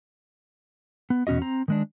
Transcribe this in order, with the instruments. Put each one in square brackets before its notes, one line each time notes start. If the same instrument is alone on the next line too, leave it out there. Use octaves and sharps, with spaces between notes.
[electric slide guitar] B3
E2 B2 C#4 F#4 D#5
C4 A#5
D#3 G#3 D4